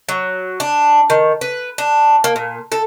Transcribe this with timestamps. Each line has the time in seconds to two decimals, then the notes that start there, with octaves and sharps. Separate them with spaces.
0.09 F#3
0.60 D4
1.10 D#3
1.41 B4
1.78 D4
2.24 A#3
2.36 A#2
2.72 A4